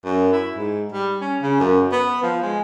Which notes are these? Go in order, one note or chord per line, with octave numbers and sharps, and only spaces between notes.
F#2
E4
G#2
G3
C#4
C#3
F#2
B3
F3
G#3